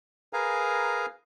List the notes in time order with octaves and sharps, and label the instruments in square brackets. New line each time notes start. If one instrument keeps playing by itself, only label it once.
[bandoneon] G#4 A#4 B4 F5 G#5 A#5